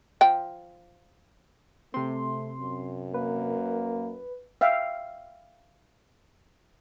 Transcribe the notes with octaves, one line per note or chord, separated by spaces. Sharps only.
F3 G5
C3 A3 C4 C6
F#2
A#3 B4
E5 F5 G5